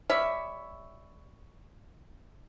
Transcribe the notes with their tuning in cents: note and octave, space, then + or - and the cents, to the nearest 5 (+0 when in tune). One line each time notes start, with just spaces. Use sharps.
G3 +20 C#5 +10 E5 +0